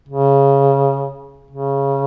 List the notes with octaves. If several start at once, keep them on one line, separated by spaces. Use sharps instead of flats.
C#3
C#3